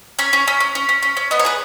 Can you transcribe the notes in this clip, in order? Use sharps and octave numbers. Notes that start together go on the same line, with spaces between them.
C#4 C#5
C#4
C#4
C#4
C#4
C#4
C#4
C#4
B3 D#5
C#5
G#4 B4